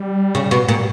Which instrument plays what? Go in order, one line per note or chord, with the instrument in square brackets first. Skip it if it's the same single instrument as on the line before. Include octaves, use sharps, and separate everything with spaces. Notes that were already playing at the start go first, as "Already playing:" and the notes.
Already playing: [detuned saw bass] G3
[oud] C#3
B2
A#2
[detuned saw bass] G3